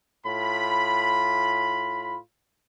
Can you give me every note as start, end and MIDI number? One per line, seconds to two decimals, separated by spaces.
0.25 2.18 45
0.25 2.18 65
0.25 2.18 83